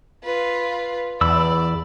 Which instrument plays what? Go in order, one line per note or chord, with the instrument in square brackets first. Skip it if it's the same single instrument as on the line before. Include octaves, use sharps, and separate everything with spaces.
[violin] F4 B4
[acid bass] E2 [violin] D5 [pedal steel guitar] B5 E6